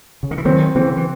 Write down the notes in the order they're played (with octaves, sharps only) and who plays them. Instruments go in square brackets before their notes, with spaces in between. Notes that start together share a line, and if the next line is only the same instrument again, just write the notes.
[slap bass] C#3
D#3
E3
[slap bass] D#3 F#3 [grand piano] C4
[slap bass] C#3 E3 [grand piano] C4
[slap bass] E3